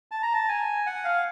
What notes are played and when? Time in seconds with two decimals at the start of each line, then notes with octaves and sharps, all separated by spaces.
0.11 A5
0.23 A#5
0.33 A5
0.49 G#5
0.86 F#5
1.05 F5